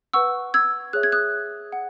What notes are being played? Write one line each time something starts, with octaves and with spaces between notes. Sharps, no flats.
B4 F#5 C#6 E6
E6 G#6
G#4 C#5 E5 F#6
G#6
D#6 F#6
F#5